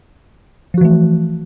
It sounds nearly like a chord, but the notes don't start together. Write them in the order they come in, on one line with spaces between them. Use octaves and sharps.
F3 F#4 E3 A3